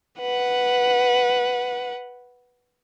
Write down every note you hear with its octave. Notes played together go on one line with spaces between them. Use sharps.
B4 F#5